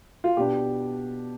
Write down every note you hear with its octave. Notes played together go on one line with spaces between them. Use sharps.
F4
B2 B3 D4 G4